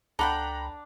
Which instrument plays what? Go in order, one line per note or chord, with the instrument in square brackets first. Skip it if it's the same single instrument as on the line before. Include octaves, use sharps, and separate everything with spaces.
[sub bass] C#2 [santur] D4 [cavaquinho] A4 F#5 G5 [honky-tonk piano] A#5 B5